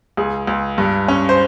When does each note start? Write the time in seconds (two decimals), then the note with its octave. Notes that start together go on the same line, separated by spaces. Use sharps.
0.17 C#2 G#4
0.47 C#2
0.78 G2
1.08 C#4
1.29 C5